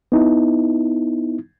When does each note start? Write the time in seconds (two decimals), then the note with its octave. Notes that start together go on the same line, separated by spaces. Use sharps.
0.12 B3 D#4 E4